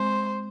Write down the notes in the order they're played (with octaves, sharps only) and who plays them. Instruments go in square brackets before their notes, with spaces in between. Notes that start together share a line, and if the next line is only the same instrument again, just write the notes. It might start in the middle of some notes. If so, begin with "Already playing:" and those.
Already playing: [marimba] G#3 C4 [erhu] C5